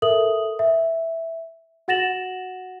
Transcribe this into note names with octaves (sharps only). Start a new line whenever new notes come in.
A4 A#4 E5 D#6 F#7
E5
F#4 F#5 A6 A#6 E7 F#7